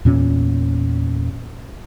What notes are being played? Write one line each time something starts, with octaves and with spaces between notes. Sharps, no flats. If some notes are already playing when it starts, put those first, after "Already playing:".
E2 A#2 C#4